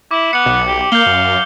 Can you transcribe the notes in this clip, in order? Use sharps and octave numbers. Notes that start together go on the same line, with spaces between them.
E4 D6
B3 C#7 F#7
B1
G4
A#3 F5 G6 G7
F#2